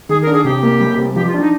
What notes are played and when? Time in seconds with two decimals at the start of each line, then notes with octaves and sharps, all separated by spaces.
0.09 D#3 G#4
0.22 A#4
0.27 D4
0.33 G#4
0.45 C3 G4
0.63 A#3
0.80 G3
0.98 C3
1.15 F3 G4
1.28 F4
1.34 D4
1.40 D#4